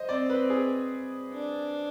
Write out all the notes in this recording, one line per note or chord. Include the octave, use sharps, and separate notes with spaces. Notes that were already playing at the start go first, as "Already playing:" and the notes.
Already playing: C5 D#5
C4 D5
B4
G#4
D4